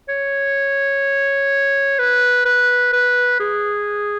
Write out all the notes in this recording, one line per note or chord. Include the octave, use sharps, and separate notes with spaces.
C#5
B4
B4
B4
G#4